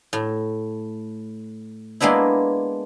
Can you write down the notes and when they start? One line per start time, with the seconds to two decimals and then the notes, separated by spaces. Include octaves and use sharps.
0.13 A2
2.01 G#3 A#3 B3 D4 E4